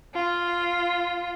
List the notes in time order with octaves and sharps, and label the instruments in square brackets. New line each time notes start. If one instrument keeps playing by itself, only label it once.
[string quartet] F4